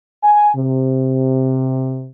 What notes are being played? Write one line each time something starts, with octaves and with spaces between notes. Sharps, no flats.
G#5
C3